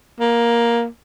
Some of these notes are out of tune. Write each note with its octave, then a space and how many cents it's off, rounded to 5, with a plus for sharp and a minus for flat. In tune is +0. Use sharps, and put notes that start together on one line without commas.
A#3 +10